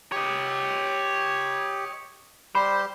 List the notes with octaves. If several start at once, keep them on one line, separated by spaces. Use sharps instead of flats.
G4 C#5 D#5
G3 G4 C5 B5